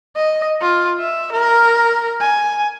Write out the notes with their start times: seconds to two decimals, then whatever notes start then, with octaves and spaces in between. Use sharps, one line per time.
0.16 D#5
0.62 F4
1.00 E5
1.32 A#4
2.21 G#5